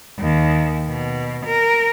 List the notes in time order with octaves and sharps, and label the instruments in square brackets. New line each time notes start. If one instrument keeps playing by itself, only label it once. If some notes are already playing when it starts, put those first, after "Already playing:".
[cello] D#2
B2
A#4